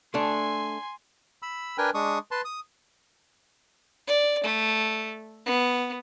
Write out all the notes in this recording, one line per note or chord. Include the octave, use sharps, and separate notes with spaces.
A3 D4 G#5 C6
B5 E6
D4 A#4 B4 G5 G#5
G#3 D4 C#6 D#6
B4 A5 C6
D#6
D5
A3
B3